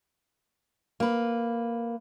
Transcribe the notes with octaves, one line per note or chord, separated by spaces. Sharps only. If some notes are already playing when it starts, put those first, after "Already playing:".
A#3 B4